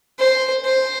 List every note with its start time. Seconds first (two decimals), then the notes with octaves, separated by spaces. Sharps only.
0.19 C5
0.64 C5